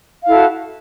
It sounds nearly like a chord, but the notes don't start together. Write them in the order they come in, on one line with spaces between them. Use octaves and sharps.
F5 E4 A4 F#4